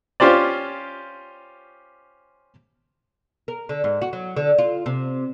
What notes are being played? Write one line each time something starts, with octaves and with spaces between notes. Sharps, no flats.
C#4 F4 G4 C5 D5
A#4
D3
G#2
F#4
F#3
D3
F4
C3